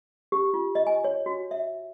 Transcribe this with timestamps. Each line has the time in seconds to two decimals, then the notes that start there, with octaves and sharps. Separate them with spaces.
0.32 G4
0.54 F4
0.75 D#5
0.87 G#5
1.04 C#5
1.26 F#4
1.51 E5